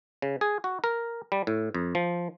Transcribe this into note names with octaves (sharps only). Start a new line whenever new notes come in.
C#3
G#4
F#4
A#4
G3
A2
F2
F3